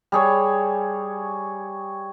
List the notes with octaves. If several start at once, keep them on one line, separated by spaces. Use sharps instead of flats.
G3 G#4 C#5